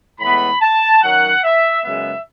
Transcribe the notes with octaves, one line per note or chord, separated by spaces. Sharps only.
A2 E3 G#3 B3 B5
A5
F#2 D#3 F#3 F#5
E5
F#2 C#3 G#3 B3 E5